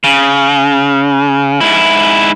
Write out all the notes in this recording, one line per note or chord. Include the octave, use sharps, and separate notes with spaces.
C#3
G#2 E4